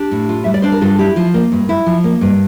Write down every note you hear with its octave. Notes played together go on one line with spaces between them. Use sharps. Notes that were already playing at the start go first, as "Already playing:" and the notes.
Already playing: D4 G4
A2
F4
G3 E5
D5
D4 C5
A#4
G2 F4 A4
E4 G4
F3 F4
A#3
G2
E4
F3
A#3
G2